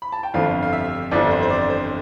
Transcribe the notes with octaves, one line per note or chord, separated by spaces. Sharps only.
B5
A5
G5
G1 F2 D3 F3 F5
F5
E5
G1 F2 D3 F3 D5
C5
C5
D5
C5